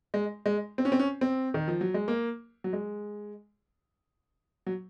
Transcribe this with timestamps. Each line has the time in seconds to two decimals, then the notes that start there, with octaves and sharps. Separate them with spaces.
0.14 G#3
0.46 G#3
0.78 C4
0.85 C#4
0.92 C4
0.99 C#4
1.21 C4
1.54 D#3
1.68 F3
1.81 F#3
1.94 G#3
2.08 A#3
2.64 F#3
2.73 G#3
4.67 F#3